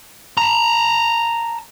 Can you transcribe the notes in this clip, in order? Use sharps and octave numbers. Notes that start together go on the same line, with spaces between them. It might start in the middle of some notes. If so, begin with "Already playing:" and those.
A5 A#5